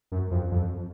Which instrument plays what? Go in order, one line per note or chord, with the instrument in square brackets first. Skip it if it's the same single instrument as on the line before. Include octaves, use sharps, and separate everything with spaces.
[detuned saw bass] F#2
F2
F2